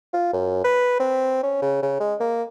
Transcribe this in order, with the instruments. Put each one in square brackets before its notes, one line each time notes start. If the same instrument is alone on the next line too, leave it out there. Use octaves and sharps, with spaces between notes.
[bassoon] F4
F#2
B4
C4
C#4
C#3
C#3
G#3
A#3